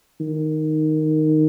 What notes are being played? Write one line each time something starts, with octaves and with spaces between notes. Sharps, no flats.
D#3